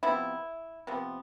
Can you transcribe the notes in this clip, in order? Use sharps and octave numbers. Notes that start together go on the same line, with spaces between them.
C3 F3 B3 E4
C3 F3 B3